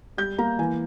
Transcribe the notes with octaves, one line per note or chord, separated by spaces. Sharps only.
G3 G6
A#3 A#5
E3 G#5